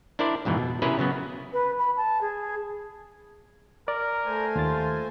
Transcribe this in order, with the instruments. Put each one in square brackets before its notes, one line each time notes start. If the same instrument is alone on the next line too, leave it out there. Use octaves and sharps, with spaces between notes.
[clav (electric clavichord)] D4 E4 A#4 C5 D5
F2 G#2 B2 E3
B2
C3 C#4 E4 G#4 A#4 B4
C#3 F#3 B3
[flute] B4
B5
A5
G#4
[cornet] A#4 [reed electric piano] D5
[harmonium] A3 C5 G#5
[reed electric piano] D#2 A6 [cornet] F4